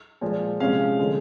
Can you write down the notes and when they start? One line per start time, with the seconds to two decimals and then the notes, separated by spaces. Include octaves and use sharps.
0.21 A#2 F3 G#3
0.60 C3 F3 G#3 C#4 F5
0.99 D3 F3 G#3